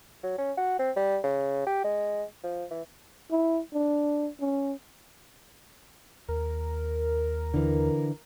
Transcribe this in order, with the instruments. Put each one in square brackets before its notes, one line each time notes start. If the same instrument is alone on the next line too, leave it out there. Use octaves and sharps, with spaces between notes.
[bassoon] F#3
C#4
F#4
C4
G3
C#3
G4
G#3
F3
E3
[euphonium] E4
D4
C#4
[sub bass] D#2 [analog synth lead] A#4
[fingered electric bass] D3 E3